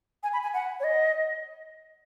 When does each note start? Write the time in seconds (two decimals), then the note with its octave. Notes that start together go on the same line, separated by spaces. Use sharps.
0.23 G#5
0.33 B5
0.43 G#5
0.54 F#5
0.80 C#5
0.84 D#5